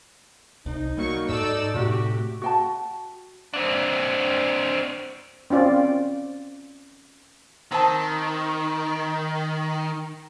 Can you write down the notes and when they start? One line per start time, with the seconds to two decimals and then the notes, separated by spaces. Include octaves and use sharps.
0.66 C2 D#4
0.97 F#3 G3 A#3 C#6
1.29 G#2 A4 D5 E6
1.74 A2 C3 A3 F#4 G4
2.42 F#4 G5 A5
3.54 C4 D4
5.50 C4 C#4 F4 D5
7.72 D#3 C4 A5